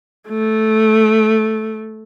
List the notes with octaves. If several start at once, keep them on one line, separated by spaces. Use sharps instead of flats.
A3